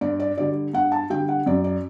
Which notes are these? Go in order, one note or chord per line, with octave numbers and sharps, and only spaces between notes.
G2 D5
D5
D3 G3 D5
G2 F#5
A5
D3 G3 G5
F#5
F#2 D5
D5